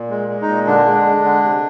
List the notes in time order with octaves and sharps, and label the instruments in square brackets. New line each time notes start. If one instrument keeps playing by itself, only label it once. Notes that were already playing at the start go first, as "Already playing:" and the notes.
Already playing: [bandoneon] A#2
G#3
G#3
D#4
A#2
D3 D4
G#3
G#3
D3
C3